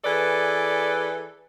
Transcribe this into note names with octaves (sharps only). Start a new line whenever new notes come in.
E3 G#4 A4 B4 D5